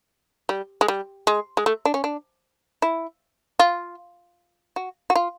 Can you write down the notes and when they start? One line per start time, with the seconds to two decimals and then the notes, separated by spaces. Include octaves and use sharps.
0.49 G3
0.81 G#3
0.88 G3
1.27 G#3
1.57 G#3
1.66 A3
1.85 D4
1.94 C#4
2.04 D4
2.82 E4
3.59 F4
4.76 F#4
5.10 F#4
5.15 F4